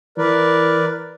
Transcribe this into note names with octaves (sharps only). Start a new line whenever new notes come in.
E3 A#4 B4 D5